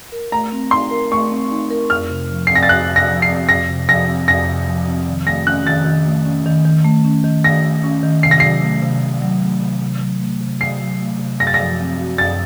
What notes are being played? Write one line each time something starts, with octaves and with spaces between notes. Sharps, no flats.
A#4
A3 A#5
C4
D#4 C6
A#4
A3 C#6
C4
D#4
A#4
F2 F6
C3
F3
C7
C4
A#6
A6
F2 F#6
C3
A#6
F3
C7
C4
F2 A#6
C3
F3 A#6
C4
F2 A#6
C3
F3
C4
D#3
A3 A#6
C#4 F#6
D#3 A6
D#3
A3
C#4
D#3
D#3
A3
C#4
D#3
D#3 A#6
A3
C#4
D#3
C3 C7
A#6
F#3 C7
A3
C3
C3
F#3
A3
C3
C3
F#3
A3
C3
C3 C7
F#3
A3
C3
F#2 A#6
A6
F3 A#6
C4
F#4
F#2 A6